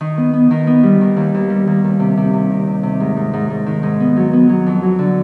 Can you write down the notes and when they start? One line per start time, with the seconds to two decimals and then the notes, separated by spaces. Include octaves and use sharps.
0.01 D#3
0.17 B3
0.33 B3
0.51 D#3
0.67 B3
0.83 G3
1.01 D#3
1.17 D#2
1.34 D#2
1.50 G3
1.67 D#2
1.84 D#2
2.00 C3
2.17 C3
2.33 C3
2.50 D#3
2.67 C3
2.83 C3
3.00 G#2
3.16 G#2
3.33 G#2
3.50 G#2
3.66 D#3
3.83 G#2
4.00 B3
4.17 F#3
4.33 B3
4.49 F#3
4.67 F2
4.83 F#3
4.99 D3